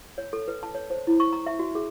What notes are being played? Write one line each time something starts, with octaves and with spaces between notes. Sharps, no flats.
C#5
A4
B4
A5
C#5
C5
E4
C#6
A#5
E5
F#4
G#4